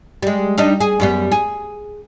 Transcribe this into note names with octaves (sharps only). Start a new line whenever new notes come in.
G3 G#3
G3 D4 D#4
G#4
F#2 G3 B3
G#4